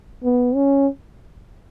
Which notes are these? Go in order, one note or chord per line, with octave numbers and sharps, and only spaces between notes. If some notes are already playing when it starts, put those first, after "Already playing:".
B3
C#4